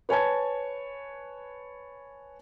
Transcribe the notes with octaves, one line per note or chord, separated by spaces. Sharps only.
B4 C#5 G#5 A5 G#6